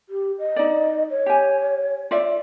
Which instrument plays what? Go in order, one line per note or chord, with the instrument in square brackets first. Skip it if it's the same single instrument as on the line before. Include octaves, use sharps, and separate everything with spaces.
[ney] G4
D#5
[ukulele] D#4 D5
[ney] C#5
[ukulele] G4 G#5
F4 D5 E5